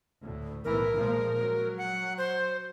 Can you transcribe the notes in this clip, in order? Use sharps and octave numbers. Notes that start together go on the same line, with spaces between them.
D2 A2
B1 A2 E3 A#4
A#2 F3 G#3
F#3
F#5
C5